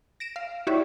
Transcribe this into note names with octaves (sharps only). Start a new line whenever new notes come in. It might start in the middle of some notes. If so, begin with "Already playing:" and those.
A#6 D7 E7
F5
E4 F#4 G4 C#5 D5 E5